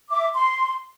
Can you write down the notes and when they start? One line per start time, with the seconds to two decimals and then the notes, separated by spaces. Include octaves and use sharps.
0.10 E5 D6
0.34 C6